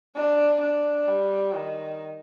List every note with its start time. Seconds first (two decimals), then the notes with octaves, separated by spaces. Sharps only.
0.15 D4
0.61 D4
1.08 G3
1.54 D#3